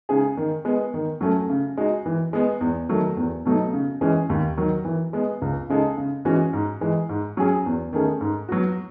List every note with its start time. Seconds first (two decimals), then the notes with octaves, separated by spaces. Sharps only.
0.09 C#3 G#3 D#4 G#4
0.37 D#3
0.65 G#3 B3
0.94 D#3
1.21 F#3 A3 C#4
1.50 C#3
1.77 G#3 D#4 F#4
2.06 E3
2.33 G#3 B3
2.61 E2
2.89 D#3 F#3 A3
3.17 E2
3.46 B2 F#3 A3 D#4
3.73 C#3
4.01 E3 G#3 C#4
4.30 D#2
4.57 D#3 F#3
4.85 E3
5.13 G#3 B3
5.42 C#2
5.70 C#3 G#3 D#4 A4
5.98 C#3
6.25 E3 G#3 C#4 F#4
6.53 G#2
6.81 E3 G#3
7.09 G#2
7.37 F#3 C#4 G#4
7.66 E2
7.93 D#3 A3 C#4 G#4
8.21 G#2
8.49 F#3 B3 F#4